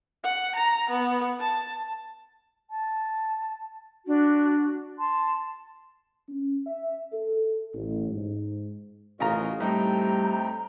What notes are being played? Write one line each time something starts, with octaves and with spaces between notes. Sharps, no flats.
F#5
A#5
B3
A5
A5
D4 F#4
A5 C6
C#4
E5
A4
A1
G#2
A1 C#3 F4 F#4 A#4 D#5 A#5
A2 G3 A3 C4 D#4 G5 A#5